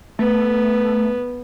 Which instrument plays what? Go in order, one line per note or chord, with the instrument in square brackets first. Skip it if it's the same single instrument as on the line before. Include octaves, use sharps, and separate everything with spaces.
[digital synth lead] A3 [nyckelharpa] B3